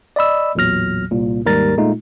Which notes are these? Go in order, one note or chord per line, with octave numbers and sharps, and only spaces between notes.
D5 D#5 B5 E6
A1 E2 A#2 F#3 F6 A#6
C2 A#2
D#2 G#2 G3 A#4 A#5 A6
A#2 G#3 A3 D#4 F4